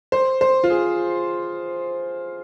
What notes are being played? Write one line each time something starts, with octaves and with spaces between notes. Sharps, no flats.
C5
C5
F4
G#4